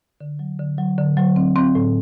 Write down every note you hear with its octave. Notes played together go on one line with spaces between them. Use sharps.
D3
F#3
D3
F#3
D3
F#3
C4
C4
A2